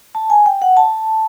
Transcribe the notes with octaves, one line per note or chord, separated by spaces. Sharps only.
A5
G#5
G5
F#5
A5